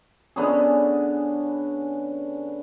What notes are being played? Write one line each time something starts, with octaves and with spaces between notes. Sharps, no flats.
D3 B3 C#4 G#4